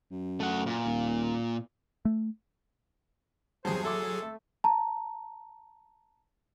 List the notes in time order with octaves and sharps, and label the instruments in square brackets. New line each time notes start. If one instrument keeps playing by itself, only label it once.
[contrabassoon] F#2
[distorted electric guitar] A3 F#5
A#2
[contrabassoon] D#1
[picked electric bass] A3
[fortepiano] E2 G2 [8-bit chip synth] F#3 G#4 [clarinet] C5
[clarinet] A4 [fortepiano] E5 C6 D6
[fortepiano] A3
[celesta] A5 A#5